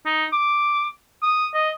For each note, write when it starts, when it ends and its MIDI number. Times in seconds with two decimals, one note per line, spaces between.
0.05 0.25 63
0.32 0.87 86
1.23 1.46 87
1.54 1.70 75